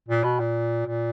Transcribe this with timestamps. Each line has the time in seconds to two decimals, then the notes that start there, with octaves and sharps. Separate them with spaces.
0.09 A#2
0.24 B2
0.40 A#2
0.86 A#2